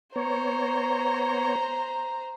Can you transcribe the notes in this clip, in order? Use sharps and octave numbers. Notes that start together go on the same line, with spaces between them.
B3 C5 C#5 A#5